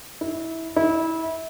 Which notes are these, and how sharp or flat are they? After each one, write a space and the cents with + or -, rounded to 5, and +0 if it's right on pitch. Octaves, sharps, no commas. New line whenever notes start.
E4 -20
E4 -25